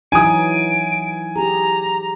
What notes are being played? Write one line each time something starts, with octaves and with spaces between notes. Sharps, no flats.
E3 F#3 D#4 G#5 D#6 D7
G4 G#4 A#5